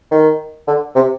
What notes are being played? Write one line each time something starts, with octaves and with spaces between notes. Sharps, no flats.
D#3
D3
C3